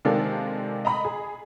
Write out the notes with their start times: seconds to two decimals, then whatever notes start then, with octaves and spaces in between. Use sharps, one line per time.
0.05 C3 D#3 G#3 A#3 D4 A4
0.85 D#5 A#5 B5
1.05 G#4